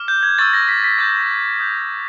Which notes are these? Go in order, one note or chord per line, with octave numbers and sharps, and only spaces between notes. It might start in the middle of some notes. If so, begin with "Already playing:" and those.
Already playing: D6 F6
G6
G#6
C#6 E6 G6 A6
A#6
B6
B6
D6 G6 A6
D#6 G6